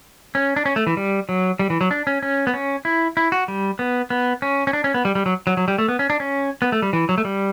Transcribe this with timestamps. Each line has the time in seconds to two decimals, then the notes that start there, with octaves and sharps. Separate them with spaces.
0.35 C#4
0.56 D4
0.65 C#4
0.76 A3
0.87 E3
0.97 G3
1.29 F#3
1.59 G3
1.70 E3
1.81 F#3
1.91 D4
2.07 C#4
2.23 C#4
2.47 B3
2.54 C#4
2.85 E4
3.17 E4
3.32 F#4
3.48 G3
3.79 B3
4.10 B3
4.42 C#4
4.67 C#4
4.73 D4
4.84 C#4
4.94 B3
5.05 G3
5.15 G3
5.26 F#3
5.47 F#3
5.57 F#3
5.68 G3
5.78 A3
5.88 B3
5.99 C#4
6.10 D4
6.20 C#4
6.62 B3
6.72 A3
6.82 G3
6.93 E3
7.09 F#3
7.18 A3
7.25 G3